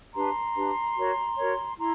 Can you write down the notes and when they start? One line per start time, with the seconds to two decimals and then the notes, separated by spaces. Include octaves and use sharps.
0.14 D4 G4 B4 A#5 C6
0.56 D4 G4 B4
0.96 F#4 A#4 C#5
1.38 F#4 A#4 C#5
1.78 E4 A#5 C6